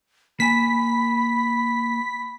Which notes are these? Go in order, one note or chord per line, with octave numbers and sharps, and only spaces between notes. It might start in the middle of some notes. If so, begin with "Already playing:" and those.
A#3 G#5 B5 B6